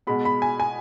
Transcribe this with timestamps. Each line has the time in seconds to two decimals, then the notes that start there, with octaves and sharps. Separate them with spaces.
0.07 B2 G#3 B3 B5
0.25 B5
0.42 G#5
0.60 G#5